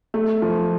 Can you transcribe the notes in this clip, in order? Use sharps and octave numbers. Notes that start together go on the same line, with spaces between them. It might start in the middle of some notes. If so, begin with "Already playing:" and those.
A3
F3